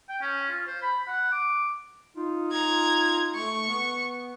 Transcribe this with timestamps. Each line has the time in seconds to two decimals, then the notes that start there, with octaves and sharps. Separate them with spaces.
0.09 G5
0.21 C#4
0.49 F4
0.67 C5
0.82 B5
1.07 F#5
1.32 D6
2.16 D#4 F4
2.52 F4 A#5 G#6
3.35 A3 C#6
3.68 B3